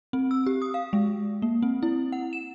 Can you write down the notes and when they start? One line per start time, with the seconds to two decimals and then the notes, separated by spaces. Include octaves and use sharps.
0.13 C4
0.31 E6
0.46 G4
0.62 D#6
0.74 F5
0.93 G#3
1.42 A#3
1.62 C4
1.83 E4
2.12 F#5
2.33 E7